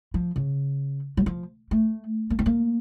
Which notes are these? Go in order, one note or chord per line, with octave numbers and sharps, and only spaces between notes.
F3
C#3
F#3
F3
A3
A#3
C4
A#3